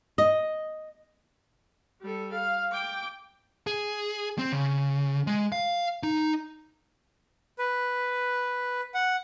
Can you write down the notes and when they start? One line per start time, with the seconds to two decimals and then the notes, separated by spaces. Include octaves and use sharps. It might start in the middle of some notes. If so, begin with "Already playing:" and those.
0.18 D#5
2.01 G3 A4
2.33 F5
2.72 G5 D6
3.67 G#4
4.39 C4
4.52 C#3
5.27 G#3
5.52 F5
6.03 D#4
7.59 B4
8.94 F#5